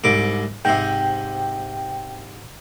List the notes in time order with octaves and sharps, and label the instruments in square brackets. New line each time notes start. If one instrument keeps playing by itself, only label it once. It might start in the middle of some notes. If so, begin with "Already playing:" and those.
[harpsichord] C2 G#2 D6
[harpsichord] G#2 C3 [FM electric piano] G5